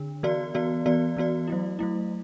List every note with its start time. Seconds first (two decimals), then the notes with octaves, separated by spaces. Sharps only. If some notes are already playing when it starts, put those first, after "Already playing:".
Already playing: D3 D4
0.23 E3 B3 F#4 D5
0.55 E3 B3 F#4 D5
0.86 E3 B3 F#4 D5
1.17 E3 B3 F#4 D5
1.48 F#3 A3 E4
1.79 F#3 A3 E4